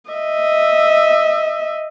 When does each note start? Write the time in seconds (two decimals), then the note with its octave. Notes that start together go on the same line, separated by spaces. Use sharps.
0.11 D#5 E5